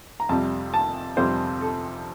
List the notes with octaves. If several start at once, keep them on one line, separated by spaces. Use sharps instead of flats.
A#5
F2 C3 G3 A5
A5
F2 C3 G3 C5
A4